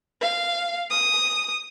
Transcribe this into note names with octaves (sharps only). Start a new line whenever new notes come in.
F5
D#6